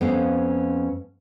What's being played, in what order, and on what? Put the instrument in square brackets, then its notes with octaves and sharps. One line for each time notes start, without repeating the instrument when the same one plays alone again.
[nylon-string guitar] F2 B3 C#4 F5